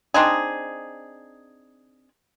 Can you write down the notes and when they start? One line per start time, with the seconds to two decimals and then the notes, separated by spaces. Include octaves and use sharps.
0.14 C4 D4 D#4 G#4